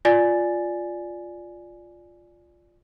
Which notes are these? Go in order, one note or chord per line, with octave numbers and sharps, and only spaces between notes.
F4 D5 G#5 A6